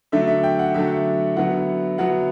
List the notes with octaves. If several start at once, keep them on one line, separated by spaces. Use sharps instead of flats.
D3 F#3 A3 D4 E5
E5
G5
F#5
D3 F#3 A3 D4 E5
D3 F#3 B3 E4 F#5
D3 F#3 B3 E4 F#5